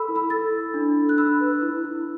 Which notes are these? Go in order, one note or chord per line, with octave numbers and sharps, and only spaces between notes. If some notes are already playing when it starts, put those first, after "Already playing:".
Already playing: A4 B5 E6
E4
B5 E6
A4 E6 A6
A4
D4
D4
F#6
D4 B5 E6
B4
E4
E4